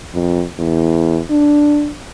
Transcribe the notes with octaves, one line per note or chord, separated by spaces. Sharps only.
F2
E2
D4